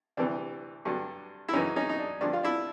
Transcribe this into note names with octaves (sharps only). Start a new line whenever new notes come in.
D2 C3 E3 G3 D4
G2 D3 F#3
E4
F#2 C#3 E3 C#4 D#4
C#4 D#4
D#4
D4
G2 D3 F3 D4
F4
D4 E4